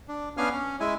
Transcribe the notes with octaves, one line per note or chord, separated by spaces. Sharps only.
D4
B3 C#4 D4 F5 G#5 F6
C#4
G#3 E4 G#5